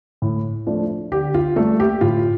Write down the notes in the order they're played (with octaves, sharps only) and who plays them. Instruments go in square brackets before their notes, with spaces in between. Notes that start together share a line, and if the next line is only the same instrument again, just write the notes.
[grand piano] A2
F3 A3 D4
D3 G4
F4
G3 A3 A#3 A4
G4
A2 F4